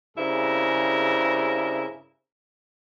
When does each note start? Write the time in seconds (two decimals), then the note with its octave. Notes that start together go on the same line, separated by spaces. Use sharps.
0.17 G2 C#3 C4 E4 G#4 A#4